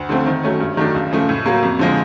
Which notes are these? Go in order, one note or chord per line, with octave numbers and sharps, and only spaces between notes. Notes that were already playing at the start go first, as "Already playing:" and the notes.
Already playing: D2
D3 F3 A3 C4
D#3
F#3 A3 C#4
G2
D#3 F#3 A3 D4
C#2
C#3 F3 A3
A2
F#3 A#3
F2
D3 F3 G#3